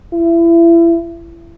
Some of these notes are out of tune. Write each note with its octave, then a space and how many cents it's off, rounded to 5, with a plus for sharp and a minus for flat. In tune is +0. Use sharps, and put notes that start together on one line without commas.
E4 +30